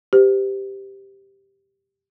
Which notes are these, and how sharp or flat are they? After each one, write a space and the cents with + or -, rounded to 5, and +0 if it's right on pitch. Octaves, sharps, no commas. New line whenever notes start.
G4 +0 C5 -35